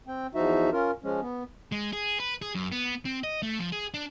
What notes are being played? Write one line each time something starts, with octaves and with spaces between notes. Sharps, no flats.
C4 G5
E2 F3 D#4 F#4 E5
C#4 F4 A#4
F3 G#3 C#4
B3
G#3
G#4
B4
G#4
F#2
B3
C4
D#5
A3
F3
G#4
D4